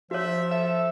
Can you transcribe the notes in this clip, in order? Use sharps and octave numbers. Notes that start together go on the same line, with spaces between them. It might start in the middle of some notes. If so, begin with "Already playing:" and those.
F3 F#4 C#5 E5
A4 E5